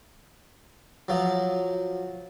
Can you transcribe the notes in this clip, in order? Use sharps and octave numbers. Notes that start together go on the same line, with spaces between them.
F3 F#3